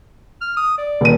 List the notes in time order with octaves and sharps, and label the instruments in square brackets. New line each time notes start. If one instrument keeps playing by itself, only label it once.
[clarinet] F6
D#6
D5
[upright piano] D#1 D#7